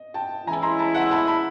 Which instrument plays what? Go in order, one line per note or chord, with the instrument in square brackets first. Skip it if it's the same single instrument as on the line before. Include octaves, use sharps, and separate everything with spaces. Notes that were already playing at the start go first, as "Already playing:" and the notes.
Already playing: [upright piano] D#5
G5 A5
[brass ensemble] E3 G#3 C#4 E4 [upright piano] G#5 A#5
[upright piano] A#5 C6
A5 B5
E5 F#5
A5 B5
A5 B5